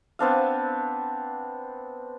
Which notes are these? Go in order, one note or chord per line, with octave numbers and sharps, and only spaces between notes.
B3 C4 D4 F5